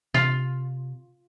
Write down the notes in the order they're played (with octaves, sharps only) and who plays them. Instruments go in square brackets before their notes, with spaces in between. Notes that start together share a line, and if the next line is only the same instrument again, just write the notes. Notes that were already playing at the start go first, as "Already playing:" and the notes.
[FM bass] C3 [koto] F4